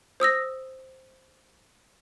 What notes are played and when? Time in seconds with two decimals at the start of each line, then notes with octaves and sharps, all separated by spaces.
0.20 C5 D#6 E6 A#6